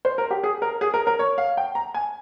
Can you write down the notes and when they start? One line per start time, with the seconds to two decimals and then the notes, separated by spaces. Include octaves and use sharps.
0.05 C5
0.18 A#4
0.31 G4
0.43 G#4
0.62 A#4
0.81 G#4
0.94 A#4
1.07 A#4
1.19 C#5
1.38 F5
1.57 G5
1.75 A#5
1.94 G#5